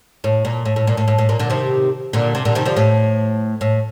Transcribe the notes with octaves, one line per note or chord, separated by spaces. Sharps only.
A2
A#2
A2
A2
A#2
A2
A2
A2
A#2
A#2 D3
C3 D#3
A#2 D3
C3
A#2 D3
C3 D#3
D3 F3
A2
A2